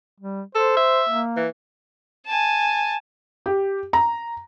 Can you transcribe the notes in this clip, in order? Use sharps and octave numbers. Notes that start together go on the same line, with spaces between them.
G3
A4 C5
E5
A#3
E3
G#5 A5
G4
A#5